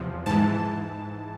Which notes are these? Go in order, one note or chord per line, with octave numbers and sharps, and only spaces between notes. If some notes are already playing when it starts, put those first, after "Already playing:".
Already playing: E2 C3 F3
G#2 E3 A5